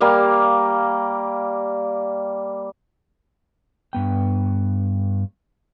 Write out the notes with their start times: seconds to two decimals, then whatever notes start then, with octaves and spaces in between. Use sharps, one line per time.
0.01 G3 A#3 F5
3.93 G2 B3 G5